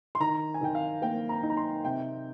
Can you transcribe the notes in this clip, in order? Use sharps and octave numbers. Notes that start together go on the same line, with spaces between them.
C6
D#3 A#5
G#5
D#3 G5
F5
A#3 G5
A#5
D#4
A#5
C6
C3 G5